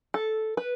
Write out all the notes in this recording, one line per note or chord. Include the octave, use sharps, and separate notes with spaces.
A4
B4